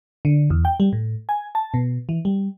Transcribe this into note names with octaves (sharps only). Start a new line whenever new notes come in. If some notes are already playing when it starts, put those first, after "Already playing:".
D3
E2
G5
G3
A2
G#5
A5
B2
E3
G3